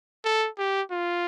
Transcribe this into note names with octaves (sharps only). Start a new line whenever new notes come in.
A4
G4
F4